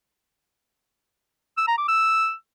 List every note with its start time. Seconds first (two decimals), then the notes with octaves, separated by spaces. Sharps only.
1.57 E6
1.68 A#5
1.78 D6
1.88 E6